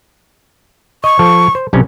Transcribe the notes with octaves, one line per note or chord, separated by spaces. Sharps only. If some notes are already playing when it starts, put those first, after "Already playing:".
D#5 C#6
F3 A4
C5
B1 C3 C#4